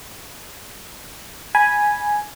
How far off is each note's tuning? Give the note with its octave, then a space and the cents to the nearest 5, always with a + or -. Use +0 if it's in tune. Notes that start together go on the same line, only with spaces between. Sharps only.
G#5 +0 B5 -15